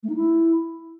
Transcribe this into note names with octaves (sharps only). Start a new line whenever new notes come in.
A3
D#4
E4